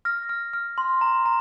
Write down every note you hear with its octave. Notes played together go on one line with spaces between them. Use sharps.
F6 A#6
F6
F6
C6
A#5
A#5